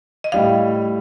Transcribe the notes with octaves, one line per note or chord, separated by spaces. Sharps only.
D#5
A2 G3 D4 F5